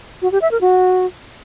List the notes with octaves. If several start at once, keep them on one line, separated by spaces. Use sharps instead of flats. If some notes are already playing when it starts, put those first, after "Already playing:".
F#4
G4
E5
A#4
F#4